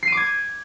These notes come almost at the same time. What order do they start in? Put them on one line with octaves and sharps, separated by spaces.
C7 D#7 D6 G#6